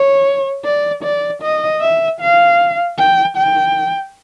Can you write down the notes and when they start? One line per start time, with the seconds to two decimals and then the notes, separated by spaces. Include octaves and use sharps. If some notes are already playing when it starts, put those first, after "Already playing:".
Already playing: C#5
0.65 D5
1.04 D5
1.42 D#5
1.81 E5
2.21 F5
2.98 G5
3.37 G5